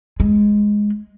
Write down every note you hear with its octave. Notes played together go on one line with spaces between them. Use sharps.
G#3